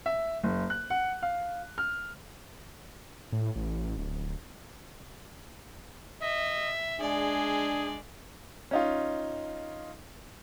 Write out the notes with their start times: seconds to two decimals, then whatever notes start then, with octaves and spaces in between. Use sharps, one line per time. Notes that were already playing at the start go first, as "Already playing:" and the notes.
0.06 E5
0.43 F#1
0.70 F#6
0.90 F#5
1.22 F5
1.78 F6
3.32 A2
3.56 A1
3.98 D1
6.22 D#5 E5
7.00 G#3 D4 G#4 D5
8.71 C#4 D#4 F4